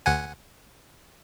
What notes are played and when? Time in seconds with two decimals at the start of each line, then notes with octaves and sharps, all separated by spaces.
0.06 D2 F#5 G#5